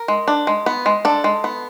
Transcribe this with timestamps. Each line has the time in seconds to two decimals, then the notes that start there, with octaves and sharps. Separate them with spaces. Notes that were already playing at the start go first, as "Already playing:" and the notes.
Already playing: A#4
0.08 G#3
0.28 D4
0.47 G#3
0.66 B3
0.86 G#3
1.05 D4 A4
1.24 G#3
1.44 B3